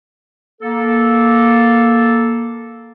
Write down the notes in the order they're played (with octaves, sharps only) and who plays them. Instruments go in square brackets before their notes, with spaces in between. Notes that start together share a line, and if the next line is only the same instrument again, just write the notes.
[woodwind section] A#3 A4